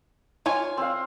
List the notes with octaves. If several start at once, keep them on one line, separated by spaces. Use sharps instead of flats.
F4 C#5 G#5
C4 F5